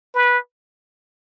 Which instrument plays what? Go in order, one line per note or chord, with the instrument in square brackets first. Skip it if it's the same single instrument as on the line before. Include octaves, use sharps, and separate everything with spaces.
[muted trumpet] B4